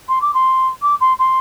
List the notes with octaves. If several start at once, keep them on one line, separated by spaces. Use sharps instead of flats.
C6
D6
C6
D6
C6
C6